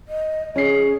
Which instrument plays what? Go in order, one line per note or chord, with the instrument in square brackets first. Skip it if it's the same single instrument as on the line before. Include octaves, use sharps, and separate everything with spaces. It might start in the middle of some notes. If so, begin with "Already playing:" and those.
[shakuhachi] D#5
[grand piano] C#4 C7 [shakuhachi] G#4